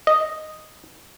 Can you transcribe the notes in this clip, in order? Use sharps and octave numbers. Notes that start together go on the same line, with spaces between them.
D#5